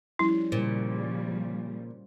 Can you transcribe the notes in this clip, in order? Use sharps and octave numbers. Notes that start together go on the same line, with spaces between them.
F3 G3 C#4 E4
A#2 C#3 F3 G3 C5